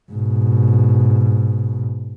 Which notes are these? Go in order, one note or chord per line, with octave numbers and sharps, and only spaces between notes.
G#2 B2